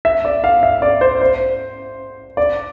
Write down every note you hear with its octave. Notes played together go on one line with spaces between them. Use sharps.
E5
D5
F5
E5
D5
C5
C5
D5